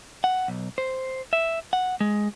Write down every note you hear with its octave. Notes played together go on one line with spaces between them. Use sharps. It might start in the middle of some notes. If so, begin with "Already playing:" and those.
F#5
B1
C5
E5
F#5
G#3